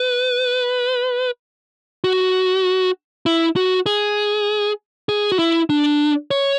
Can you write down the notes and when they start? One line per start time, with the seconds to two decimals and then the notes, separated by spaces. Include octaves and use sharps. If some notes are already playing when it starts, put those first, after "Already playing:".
Already playing: B4
2.04 F#4
3.26 E4
3.56 F#4
3.86 G#4
5.09 G#4
5.32 F#4
5.39 E4
5.70 D4
6.31 C#5